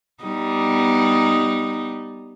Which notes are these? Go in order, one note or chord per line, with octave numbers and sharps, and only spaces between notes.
G3 B3 D#4